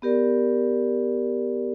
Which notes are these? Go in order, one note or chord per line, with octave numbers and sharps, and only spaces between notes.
B3 G4 A#4 D5